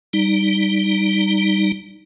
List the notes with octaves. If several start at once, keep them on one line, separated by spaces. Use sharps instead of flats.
G3 D#4